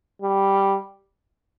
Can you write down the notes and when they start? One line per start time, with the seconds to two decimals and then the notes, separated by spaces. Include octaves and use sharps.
0.22 G3